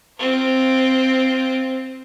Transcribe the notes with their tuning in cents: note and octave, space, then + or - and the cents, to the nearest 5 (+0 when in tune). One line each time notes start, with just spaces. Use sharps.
C4 +0 F4 +0